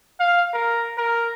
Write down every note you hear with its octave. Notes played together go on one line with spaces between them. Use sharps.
F5
A#4
A#4